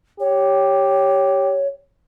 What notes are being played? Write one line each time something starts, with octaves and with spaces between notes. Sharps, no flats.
G4 C#5